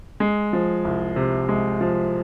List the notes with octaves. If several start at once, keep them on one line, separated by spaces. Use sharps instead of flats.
G#3
F3
C2
C3
G#3
F3